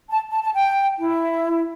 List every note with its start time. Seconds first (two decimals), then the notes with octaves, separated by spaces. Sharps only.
0.09 A5
0.31 A5
0.43 A5
0.54 G5
0.98 E4